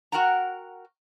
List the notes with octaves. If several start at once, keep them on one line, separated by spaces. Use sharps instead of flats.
F#4 A#4 F#5 G5 A#5